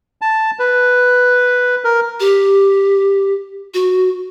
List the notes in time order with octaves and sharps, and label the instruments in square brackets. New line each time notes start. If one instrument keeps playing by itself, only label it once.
[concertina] A5
B4
A#4
[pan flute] G4
F#4